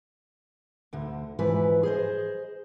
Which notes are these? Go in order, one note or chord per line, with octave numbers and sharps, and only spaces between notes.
D2 D3
G#2 E3 F3 B4
G#4 C5 D#5